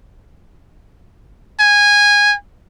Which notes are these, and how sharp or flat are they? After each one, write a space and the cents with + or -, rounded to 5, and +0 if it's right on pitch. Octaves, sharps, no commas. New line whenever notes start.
G#5 -15